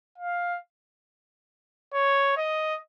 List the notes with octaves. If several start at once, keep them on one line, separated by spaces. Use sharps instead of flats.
F5
C#5
D#5